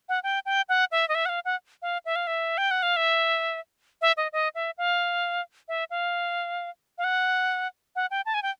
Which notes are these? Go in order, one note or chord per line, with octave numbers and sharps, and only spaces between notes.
F#5
G5
G5
F#5
E5
D#5
E5
F#5
F5
F#5
F5
E5
F5
E5
G5
F#5
F5
E5
E5
D#5
D#5
E5
F5
E5
F5
F5
F#5
F#5
G5
A5
G#5
G5